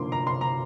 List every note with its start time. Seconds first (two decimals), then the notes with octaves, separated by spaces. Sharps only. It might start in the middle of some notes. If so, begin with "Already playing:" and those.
Already playing: D3 F3 A#3 C6 D6
0.12 A#5
0.27 C6
0.41 A#5